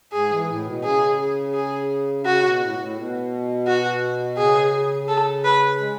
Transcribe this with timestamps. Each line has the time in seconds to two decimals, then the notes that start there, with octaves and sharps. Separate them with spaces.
0.12 G#2 G#4
0.30 E3
0.49 A2
0.66 B2
0.83 C#3 G#4
1.54 G#4
2.25 C#3 F#4
2.43 B2
2.61 A2
2.79 A2
2.96 B2
3.67 F#4
4.37 C#3 G#4
5.08 A4
5.45 B4
5.80 G#3